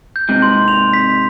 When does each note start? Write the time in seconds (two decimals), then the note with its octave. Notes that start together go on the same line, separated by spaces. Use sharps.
0.16 G6
0.29 G#2 C3
0.42 C6
0.68 F7
0.93 B6